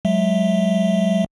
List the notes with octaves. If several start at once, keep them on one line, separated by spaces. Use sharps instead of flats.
F#3 G#3 E5